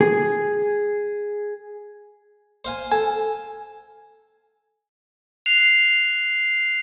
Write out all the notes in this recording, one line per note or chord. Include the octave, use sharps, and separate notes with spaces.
G#4
C5 F5 G#5
A4 G#5
F#6 C7 F7